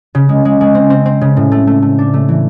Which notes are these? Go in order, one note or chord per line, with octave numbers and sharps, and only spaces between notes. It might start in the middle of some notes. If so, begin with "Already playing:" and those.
C#3
G#3
G#3
G#3
C4
C4
C4
C#3
A2
A3
A3
A3
D4
A3
E3